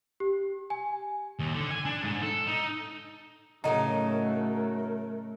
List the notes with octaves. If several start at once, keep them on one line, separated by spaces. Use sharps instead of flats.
G4
G#5
D#2
D3
G#5
D4
G#2
A4
D#4
A2 C#3 F#3 A3 D#4 A#4